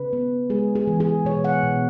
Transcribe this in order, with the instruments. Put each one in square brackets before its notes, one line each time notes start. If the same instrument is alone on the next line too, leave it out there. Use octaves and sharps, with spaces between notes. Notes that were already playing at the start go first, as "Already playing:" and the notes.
Already playing: [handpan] C#3 B4
B3
G#3 G#4
G#4
E3
G#4
B2 C#5
F#5
B2